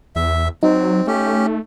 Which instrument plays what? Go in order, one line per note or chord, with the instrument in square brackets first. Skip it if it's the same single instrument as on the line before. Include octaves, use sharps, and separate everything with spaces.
[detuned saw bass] E2 [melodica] E5
[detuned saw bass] F#3 [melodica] C4 [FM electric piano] D#4
[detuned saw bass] A3 [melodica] C#4 G4